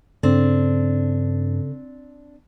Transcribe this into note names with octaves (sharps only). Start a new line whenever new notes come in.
G2 C#3 C4 D4 A4